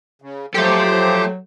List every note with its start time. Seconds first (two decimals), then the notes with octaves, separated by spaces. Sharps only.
0.22 C#3
0.54 F3 F#3 G4 A4 C5 E5